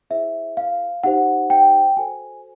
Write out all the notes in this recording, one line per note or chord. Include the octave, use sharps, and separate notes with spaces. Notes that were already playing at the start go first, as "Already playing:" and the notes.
E4 G#4 C5 E5
F5
D#4 G4 C5 F#5
G5
F#4 A4 C5 G#5